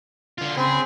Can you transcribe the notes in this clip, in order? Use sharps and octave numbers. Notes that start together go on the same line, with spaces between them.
D3 F4
C#3 C4 G#4 B5